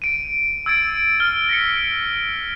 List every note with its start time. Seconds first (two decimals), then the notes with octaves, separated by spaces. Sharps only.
0.02 D7 D#7
0.66 E6 G#6 A6 D7
1.20 E6 F6 G7
1.49 A#6 B6 C#7